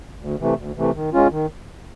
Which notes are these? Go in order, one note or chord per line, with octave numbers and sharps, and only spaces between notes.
D2
C3 E3 A3
D2
C3 E3 A3
D#3
G#3 C#4 F4
D#3